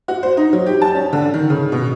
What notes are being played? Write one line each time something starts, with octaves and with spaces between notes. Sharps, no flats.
F#4
C5
D#4
F#3
G4
A5
C#4
D3
D#3
C#3
B2